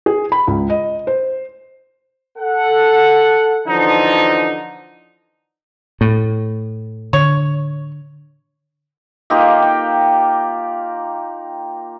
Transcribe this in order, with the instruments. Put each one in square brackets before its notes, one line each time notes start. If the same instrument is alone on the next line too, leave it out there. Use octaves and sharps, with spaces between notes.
[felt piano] G#4
B5
C#2
D#5
C5
[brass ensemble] A4 F#5
D3 E3 F3 D#4
[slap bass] A2
[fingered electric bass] D3 [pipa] C#5
[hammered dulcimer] A#3 D#4 F4 G4
G5